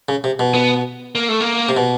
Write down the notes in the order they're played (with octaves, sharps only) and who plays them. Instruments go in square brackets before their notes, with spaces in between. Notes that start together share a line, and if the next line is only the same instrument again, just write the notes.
[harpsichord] C#3
C3
B2
[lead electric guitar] B3
A#3
A3
A#3
[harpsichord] C3
B2